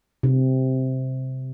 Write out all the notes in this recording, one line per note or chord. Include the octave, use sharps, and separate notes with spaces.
C3